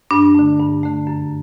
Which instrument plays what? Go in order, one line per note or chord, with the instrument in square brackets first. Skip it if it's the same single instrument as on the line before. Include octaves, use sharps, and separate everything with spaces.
[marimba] G2 D4
D3 A3
G2
D3 A3
F#2